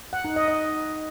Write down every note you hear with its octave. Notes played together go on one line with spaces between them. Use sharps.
F#5
D#4
D#5
D#5